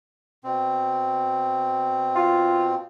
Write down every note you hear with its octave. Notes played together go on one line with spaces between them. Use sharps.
B2 C4
F4